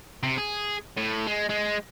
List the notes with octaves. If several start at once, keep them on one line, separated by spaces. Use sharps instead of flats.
C3
G#4
A2
G#3
G#3